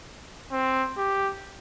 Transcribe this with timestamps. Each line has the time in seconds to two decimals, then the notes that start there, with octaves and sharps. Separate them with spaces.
0.52 C4
0.97 G4